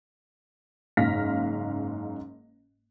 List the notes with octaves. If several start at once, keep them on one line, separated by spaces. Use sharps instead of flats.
F#1 G#2 F5 F6 A#6 B6